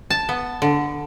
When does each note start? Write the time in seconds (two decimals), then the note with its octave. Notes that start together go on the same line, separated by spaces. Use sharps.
0.10 A5
0.29 B3
0.62 D3